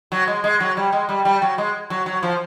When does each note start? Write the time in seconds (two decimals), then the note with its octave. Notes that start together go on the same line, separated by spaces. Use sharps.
0.12 F#3
0.27 G#3
0.44 G#3
0.60 F#3
0.77 G3
0.93 G#3
1.09 G3
1.25 G3
1.42 F#3
1.58 G#3
1.90 F#3
2.06 F#3
2.23 F3